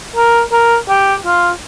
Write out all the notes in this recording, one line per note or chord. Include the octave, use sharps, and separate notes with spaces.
A#4
A#4
G4
F4